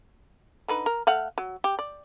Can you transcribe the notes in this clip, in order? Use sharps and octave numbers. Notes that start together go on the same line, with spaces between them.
D3 D#4 B4
A#4
A3 F5 F#5
F#3
G4
D5